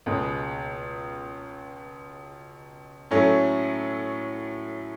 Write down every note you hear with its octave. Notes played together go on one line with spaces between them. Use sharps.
C#2 B2 G#3
A2 F#3 A3 C#4